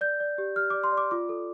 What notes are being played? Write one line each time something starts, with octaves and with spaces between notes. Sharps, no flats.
D5 G6
D5
G4
G4 F6
D6
D5
C6
D5
D6
F4 D6
A4